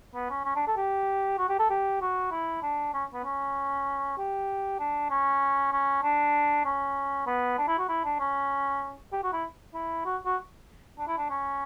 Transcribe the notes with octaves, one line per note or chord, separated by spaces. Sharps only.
B3
C#4
C#4
D4
A4
G4
F#4
G4
A4
G4
F#4
E4
D4
C#4
B3
C#4
G4
D4
C#4
C#4
D4
C#4
B3
D4
E4
F#4
E4
D4
C#4
G4
F#4
E4
E4
F#4
F#4
D4
E4
D4
C#4